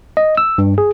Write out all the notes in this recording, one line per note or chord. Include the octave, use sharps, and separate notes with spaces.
D#5
E6
G2
G#4